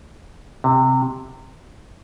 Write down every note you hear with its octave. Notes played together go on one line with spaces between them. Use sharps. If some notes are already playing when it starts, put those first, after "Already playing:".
C3